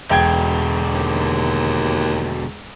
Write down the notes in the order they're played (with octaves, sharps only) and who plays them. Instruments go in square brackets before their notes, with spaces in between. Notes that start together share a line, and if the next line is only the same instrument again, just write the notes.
[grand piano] E1 G5 G#6 [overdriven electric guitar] B2 D3
[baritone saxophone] D#2